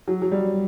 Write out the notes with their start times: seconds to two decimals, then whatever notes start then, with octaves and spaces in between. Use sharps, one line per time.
0.08 F#3
0.22 F#3
0.32 G3